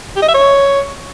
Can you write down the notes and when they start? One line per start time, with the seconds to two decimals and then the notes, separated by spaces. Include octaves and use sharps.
0.16 G4
0.22 D#5
0.28 E5
0.34 C#5